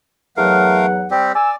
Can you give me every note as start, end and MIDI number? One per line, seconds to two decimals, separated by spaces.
0.37 1.07 40
0.37 1.07 54
0.37 0.86 57
0.37 0.86 70
0.37 0.86 77
0.37 1.07 78
1.11 1.32 55
1.11 1.32 60
1.11 1.32 67
1.35 1.56 74
1.35 1.51 80
1.35 1.51 88